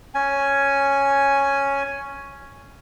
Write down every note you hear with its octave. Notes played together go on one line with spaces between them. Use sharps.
C#4 G#5